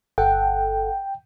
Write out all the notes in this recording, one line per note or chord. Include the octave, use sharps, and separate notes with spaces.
G1 A4 F#5 G5